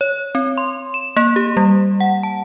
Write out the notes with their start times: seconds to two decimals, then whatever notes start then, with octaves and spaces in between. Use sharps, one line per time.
0.01 C#5
0.35 C4
0.58 C6
0.94 E7
1.17 A#3
1.36 G4
1.57 G3
2.00 F#5
2.23 A5